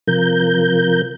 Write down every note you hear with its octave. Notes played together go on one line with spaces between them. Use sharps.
C3 F3 A#4 G6